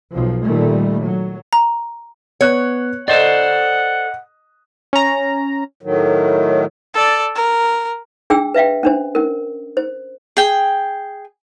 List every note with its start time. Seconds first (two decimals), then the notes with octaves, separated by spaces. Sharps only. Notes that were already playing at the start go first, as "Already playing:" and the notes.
0.11 B1 F3
0.46 A#2 D#3 G3 A3
1.02 F#3
1.53 A#5
2.41 B3 C#5 F#6
3.08 A4 C5 D5 D#5 F#5
4.93 C#4 A#5
5.82 A2 D#3 F#3
6.94 A4 D5
7.36 A#4
8.30 D4 G#4 G5 E6
8.54 B4 E5 F5 G5
8.83 C#4 D4 C5
9.15 C#4 A#4
9.77 C5
10.37 G#4 G5